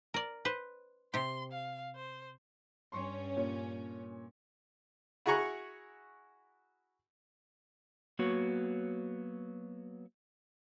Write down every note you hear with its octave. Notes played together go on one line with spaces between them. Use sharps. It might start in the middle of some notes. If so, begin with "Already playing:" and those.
A#4 D5
B4 C5
C3 G4 C6
F5
C5
G2 C#4 C6 C#6
A#2 C#5
E4 F#4 G#4 A#5 C#6 F#6
F#3 A#3 B3 F#4 C#5